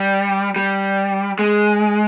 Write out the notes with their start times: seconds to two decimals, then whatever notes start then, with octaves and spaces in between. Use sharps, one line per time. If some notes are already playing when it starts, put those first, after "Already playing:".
Already playing: G3
0.56 G3
1.39 G#3